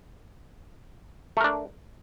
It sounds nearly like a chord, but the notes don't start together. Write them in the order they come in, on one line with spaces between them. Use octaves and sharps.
A3 A#4 D4